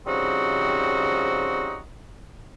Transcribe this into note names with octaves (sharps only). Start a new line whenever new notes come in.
C#3 F3 G3 C4 D#4 F#4